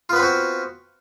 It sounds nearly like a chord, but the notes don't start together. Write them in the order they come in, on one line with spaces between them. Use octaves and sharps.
F4 B3 B4 C4 F#4